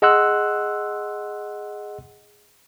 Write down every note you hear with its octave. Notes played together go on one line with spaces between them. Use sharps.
G#4 D#5 F#5 C6 E6 F#6